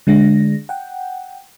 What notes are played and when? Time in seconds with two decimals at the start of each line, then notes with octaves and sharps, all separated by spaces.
0.07 D3 G#3 D4 A#6
0.69 F#5 G5